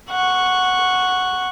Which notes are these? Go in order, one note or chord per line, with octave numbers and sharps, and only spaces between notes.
F#5 C#6